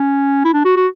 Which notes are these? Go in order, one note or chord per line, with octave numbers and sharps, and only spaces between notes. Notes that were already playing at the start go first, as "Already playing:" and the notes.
Already playing: C#4
E4
D4
F#4
F#4